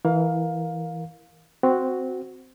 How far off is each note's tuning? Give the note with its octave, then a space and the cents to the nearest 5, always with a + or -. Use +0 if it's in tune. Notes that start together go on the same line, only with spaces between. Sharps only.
E3 -10 A#4 +0 F5 +20
C4 -10 F#4 +0